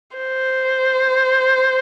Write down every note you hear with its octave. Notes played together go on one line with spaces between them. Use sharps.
C5